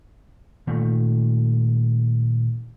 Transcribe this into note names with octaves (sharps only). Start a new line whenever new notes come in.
A#2 D#3 A3